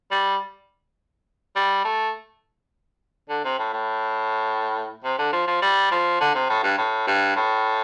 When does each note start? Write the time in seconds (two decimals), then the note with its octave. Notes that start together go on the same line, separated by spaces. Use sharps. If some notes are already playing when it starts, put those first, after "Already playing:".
0.11 G3
1.56 G3
1.85 A3
3.29 D3
3.44 C3
3.59 A2
3.73 A2
5.04 C3
5.18 D3
5.33 F3
5.47 F3
5.62 G3
5.91 F3
6.20 D3
6.34 C3
6.49 A2
6.63 G2
6.78 A2
7.07 G2
7.36 A2